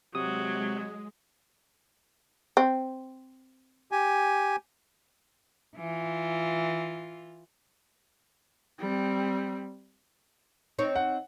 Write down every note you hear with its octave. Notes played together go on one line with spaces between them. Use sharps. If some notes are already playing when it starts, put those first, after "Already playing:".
C3 F#3 G#3 D#6
C4
G4 G#5
E3 F4
G3 C4
C4 D#4 C#5
F#5